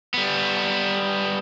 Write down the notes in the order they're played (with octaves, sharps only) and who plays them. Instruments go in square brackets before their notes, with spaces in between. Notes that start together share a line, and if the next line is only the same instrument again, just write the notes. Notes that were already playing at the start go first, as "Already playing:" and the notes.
[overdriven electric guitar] G3 B3